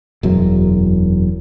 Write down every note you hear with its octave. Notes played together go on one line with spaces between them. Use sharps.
E1 F#2 F#3